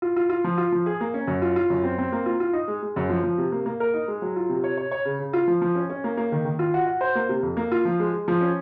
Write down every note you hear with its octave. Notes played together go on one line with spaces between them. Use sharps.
F4
F4
F4
F3
F4
F3
G#4
A#3
C#4
F#2
F4
F4
F#2
C4
C4
A#3
F4
F4
D#4
G#3
G#3
F#2
F3
F3
C3
A#3
A#3
A#4
D#4
G#3
F#3
F4
C3
C#5
C#5
C#5
C#3
C#3
F4
F3
F3
C#4
C#4
A#3
A#3
D#3
D#3
F4
F#4
F#4
C5
A#3
C3
F2
A#3
F4
F3
G#3
G#3
F3
C#4